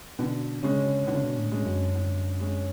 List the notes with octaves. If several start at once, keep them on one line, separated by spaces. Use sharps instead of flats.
B2 D3
C#3 G#3 C#4
B2 D3
C#3
B2
A2
G#3 C#4
F#2
D3
G#3 C#4